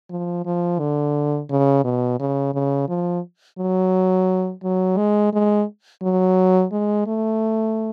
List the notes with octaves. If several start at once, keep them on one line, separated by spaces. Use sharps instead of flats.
F3
F3
D3
C#3
B2
C#3
C#3
F3
F#3
F#3
G#3
G#3
F#3
G#3
A3